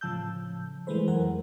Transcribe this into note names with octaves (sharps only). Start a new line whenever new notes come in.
A2 C#3 F3 A5 E6 G6
E3 G#3 A3 B4 C5
F2 F#3 A#4 F#5 G#5